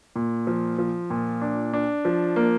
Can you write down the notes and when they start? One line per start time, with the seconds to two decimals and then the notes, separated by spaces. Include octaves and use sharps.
0.16 A#2
0.47 F3
0.78 F3
1.10 A#2
1.42 D4
1.73 D4
2.05 F3
2.36 A#3